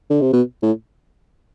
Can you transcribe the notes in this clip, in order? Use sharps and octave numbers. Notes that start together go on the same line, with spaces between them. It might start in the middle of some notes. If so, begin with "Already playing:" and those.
D3
C3
B2
A2